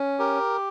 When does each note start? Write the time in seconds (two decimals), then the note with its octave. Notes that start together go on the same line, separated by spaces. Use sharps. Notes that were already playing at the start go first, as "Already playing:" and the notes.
Already playing: C#4
0.19 G4 A#4